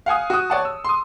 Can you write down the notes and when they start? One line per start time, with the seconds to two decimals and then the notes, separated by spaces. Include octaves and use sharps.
0.06 F5 F#5 G#5 D#6
0.30 F#4 D#6
0.50 C#5 D5 F#5 A5
0.65 E6
0.85 C6 D#6